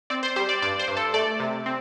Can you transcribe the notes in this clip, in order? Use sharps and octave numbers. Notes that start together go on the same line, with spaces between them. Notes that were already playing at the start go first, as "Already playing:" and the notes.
C4 D5
C5
G3 C5
D5
G2 D5
C5
G2
A4
A3 D5
C3
C4